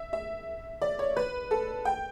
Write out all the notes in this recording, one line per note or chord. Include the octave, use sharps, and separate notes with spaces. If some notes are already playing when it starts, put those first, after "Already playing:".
Already playing: E5
E5
D5
C#5
B4
A4
G5